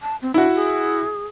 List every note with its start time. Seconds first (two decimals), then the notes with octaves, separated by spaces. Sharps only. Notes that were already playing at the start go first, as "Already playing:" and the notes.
0.02 A5
0.22 C4
0.34 D4 E4 F#4
0.55 G#4